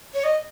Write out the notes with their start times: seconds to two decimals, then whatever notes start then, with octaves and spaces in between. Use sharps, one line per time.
0.14 C#5
0.24 D#5